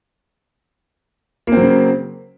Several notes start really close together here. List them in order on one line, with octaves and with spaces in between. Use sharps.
A#3 C4 F#3 C#3